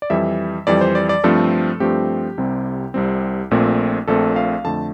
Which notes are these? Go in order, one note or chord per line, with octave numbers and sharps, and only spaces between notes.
D5
F2 E3 G3 E5
F2 E3 G3 D5
C5
D5
D5
G2 F3 A3 C4 A4
G2 F3 A3 C4 G4
C2 C3 G3 C4
C2 C3 G3 C4
A#1 A#2 A3 C4
A#1 A#2 A3 C4 A4
F5
F2 D3 A3 A5